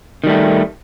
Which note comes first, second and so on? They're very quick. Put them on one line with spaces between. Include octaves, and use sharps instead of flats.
D#3 G3 A3